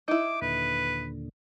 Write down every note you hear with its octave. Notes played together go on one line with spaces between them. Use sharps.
D#4 E4 D6
D#2 A#2 D3 B4